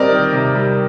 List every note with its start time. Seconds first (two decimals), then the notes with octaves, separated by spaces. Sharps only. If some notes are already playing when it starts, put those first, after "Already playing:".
Already playing: G3 C4 A#4 D5 D#5
0.11 D#3
0.33 C3
0.55 G3